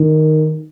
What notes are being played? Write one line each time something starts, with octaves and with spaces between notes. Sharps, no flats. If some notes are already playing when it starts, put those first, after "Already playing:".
Already playing: D#3